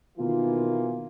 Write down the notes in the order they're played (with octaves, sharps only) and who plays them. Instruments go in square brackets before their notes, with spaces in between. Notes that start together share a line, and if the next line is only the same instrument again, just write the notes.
[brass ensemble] B2 D#3 E3 A#3 F4